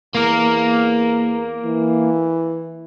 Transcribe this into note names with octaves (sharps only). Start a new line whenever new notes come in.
E2 A#3 A#4
E3